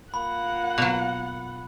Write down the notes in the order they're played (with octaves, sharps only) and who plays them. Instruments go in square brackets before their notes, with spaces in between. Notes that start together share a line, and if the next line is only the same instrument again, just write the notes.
[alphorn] A#3 [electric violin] F4 F#5 [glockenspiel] B5
[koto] B2 F#3